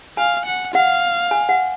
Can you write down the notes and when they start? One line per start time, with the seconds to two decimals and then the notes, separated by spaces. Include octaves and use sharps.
0.17 F5 G#5
0.45 F#5
0.74 F5 F#5
1.31 G#5
1.49 F#5